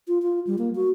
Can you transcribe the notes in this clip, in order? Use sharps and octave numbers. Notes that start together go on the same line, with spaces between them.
F4
F4
G3
A#3
F#4